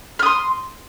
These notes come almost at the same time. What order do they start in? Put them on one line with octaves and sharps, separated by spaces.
F6 D#6 C6